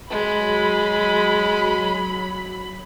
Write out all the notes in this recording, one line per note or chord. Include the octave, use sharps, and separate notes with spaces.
F#3 G#3 B5